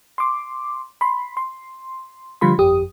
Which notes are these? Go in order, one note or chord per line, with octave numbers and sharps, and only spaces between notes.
C6 D6
B5 C6
C6
D3 F3 G3 F4 B5 C6
G1 F2 G4 D#6